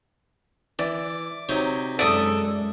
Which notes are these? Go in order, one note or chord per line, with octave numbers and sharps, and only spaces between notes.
E3 D5
C3 F#3 D#4
F#2 G#3 A4 D5 E5 D#6